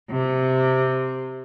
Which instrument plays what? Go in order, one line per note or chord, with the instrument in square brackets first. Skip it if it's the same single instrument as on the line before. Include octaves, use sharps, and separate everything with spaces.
[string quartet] C3